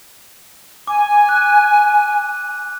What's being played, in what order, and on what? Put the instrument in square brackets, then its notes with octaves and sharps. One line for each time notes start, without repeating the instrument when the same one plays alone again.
[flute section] G#5 [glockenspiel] D6
[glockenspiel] F#6